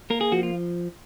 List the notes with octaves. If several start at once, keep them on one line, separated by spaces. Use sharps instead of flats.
A#3 A#4
G#4
F3 F#4
F4